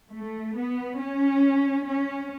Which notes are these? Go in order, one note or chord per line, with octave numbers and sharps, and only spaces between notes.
A3
B3
C#4
C#4